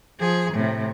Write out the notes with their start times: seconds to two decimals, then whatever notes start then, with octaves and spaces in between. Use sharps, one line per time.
0.21 F3 G#4
0.53 A2 C3